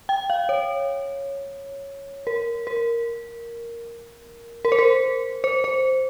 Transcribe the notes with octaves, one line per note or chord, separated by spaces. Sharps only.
G5
F5
C#5
A#4
A#4
A#4
C5
A#4
C5
C5